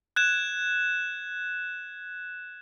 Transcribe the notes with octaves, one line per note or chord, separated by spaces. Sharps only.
F#6 G#6 E7